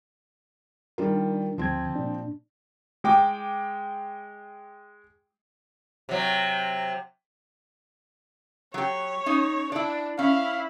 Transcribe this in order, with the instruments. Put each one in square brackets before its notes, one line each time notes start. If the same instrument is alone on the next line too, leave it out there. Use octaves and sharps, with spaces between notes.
[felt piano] D#3 G3 F4 [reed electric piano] D4 A#4
[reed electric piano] D2 D3 G#6 [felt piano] F3 C4
[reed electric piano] A#2 D4
[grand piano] G#3 G5 D6
[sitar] C3 F#3
[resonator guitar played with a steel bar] F#3 G4 [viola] C#5
[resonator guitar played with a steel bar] C#4 D#4
[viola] D4 [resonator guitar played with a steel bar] E4 D5
[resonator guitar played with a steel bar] C#4 [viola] E4 [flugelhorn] F5